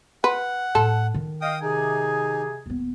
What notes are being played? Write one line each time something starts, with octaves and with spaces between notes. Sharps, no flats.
B4 F#5
A2 A4
D#3
D#5 F5 G5 D#6
C3 D#4 G#4 G#5
D#1 B3